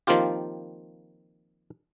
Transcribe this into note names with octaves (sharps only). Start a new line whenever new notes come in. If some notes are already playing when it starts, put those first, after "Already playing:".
D#3 F3 A#3 C4 F4 G4